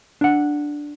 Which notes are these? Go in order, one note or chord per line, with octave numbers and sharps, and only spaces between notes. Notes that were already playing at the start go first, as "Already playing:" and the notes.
D4 F#5